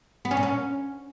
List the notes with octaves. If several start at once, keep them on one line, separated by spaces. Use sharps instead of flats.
B3
C#4
A#2
C#4